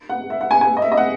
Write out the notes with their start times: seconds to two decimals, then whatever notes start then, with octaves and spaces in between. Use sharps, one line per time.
0.09 F#5
0.30 E5
0.41 F#5
0.51 G#5
0.61 G#5
0.77 D#5
0.82 E5
0.92 D#5
0.97 F#5